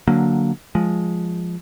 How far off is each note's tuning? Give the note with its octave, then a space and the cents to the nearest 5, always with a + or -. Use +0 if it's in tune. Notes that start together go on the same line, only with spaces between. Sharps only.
D3 +0 F#3 +0 A#3 +0
F3 +0 G#3 +0